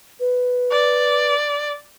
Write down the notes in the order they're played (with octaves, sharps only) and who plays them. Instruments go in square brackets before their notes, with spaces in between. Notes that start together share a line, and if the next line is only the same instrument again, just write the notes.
[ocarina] B4
[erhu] D5